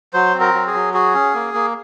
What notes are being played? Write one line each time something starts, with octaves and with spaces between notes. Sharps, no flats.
F#3 C5
C4
A#4
F#3
G#4
F#3
F#4 G#4
C#4
A#3
A#3